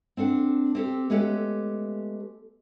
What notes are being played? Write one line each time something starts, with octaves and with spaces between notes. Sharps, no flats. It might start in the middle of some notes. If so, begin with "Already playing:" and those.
C4 D4 A4 F#5
C4 G4 A4
G#3 A3 B3 C#4 G4 A4